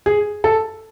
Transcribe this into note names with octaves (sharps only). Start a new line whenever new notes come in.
G#4
A4